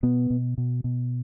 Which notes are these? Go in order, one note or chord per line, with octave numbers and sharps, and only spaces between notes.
B2 B3
B2
B2
B2